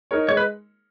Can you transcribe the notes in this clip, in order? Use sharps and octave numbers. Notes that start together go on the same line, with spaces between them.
D#4 A#4 C#5
G#3 C#5
B4